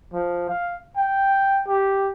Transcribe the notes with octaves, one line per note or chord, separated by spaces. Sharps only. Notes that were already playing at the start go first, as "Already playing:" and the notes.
F3
F5
G5
G4